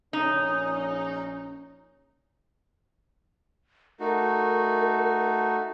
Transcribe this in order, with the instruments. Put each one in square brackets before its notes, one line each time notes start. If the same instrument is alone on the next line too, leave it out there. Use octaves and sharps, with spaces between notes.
[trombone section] A#1 C#4 [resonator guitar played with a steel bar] D#4
[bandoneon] A3 D#4 F#4 [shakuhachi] A#4